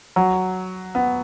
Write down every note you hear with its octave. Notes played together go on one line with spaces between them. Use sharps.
F#3
B3